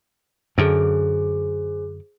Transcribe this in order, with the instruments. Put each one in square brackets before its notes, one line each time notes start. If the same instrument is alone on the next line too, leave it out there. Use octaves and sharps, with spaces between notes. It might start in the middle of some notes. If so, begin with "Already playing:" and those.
[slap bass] F#2 D3 [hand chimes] G#4 C5